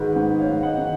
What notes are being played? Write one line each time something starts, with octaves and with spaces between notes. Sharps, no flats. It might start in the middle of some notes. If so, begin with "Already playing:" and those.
Already playing: G#2 D#3 G#3 F#4 G#4 B4
G#2
C#5 F5
G#2
D#5 F#5
D#3